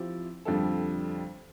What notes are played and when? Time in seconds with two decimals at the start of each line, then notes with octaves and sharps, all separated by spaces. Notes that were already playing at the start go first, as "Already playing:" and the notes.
Already playing: F3 C4 E4 G4
0.45 F2 D3 G3 D4 A4